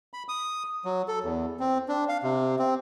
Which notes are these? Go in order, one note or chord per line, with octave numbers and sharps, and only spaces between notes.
B5
D#6
F#3
A4
E2
C4
D4
F5
C3
C4